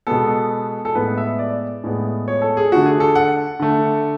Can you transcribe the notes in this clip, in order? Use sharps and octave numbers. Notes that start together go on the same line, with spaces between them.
B2 G#3 B3 A4
A4
A2 G#3 B3 B4
E5
D5
A2 G#3 B3
C#5
A4
G#4
D3 A3 F#4
G#4
A4
F#5
D3 A3